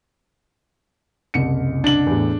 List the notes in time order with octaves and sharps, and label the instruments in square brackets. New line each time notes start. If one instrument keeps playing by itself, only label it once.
[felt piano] F#1 C2 C#7
[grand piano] D4 F#7
[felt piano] E2 A2